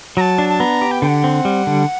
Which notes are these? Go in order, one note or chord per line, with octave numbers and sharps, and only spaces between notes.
F#3 A5 A#5
D4
A5
B3 A#5
G4
G5
D3 G5
F#5
C4
G3
D3